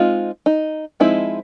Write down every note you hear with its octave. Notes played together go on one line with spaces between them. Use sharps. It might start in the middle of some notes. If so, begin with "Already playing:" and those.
Already playing: G#3 C4 D#4 F4
D#4
F3 G#3 C4 D#4 E4